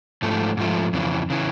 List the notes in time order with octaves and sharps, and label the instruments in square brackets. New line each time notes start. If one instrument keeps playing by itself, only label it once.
[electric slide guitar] G#2 F3 A3
G#2 F3 A3
F2 C#3 E3
C#3 E3